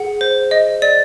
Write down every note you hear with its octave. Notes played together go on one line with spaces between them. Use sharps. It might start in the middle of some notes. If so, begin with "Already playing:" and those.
Already playing: G#4 F#5
C5
D#5
D5